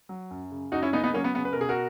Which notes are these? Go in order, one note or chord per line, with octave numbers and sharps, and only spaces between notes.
F#3
F#2
C#3
F#2 D#4 F#4
C#4 E4
C#3 B3 D#4
B3 D#4
F#3 A#3 C#4
B3
C#3 B3
B4
B2 A#4
G#4
F#4 A#4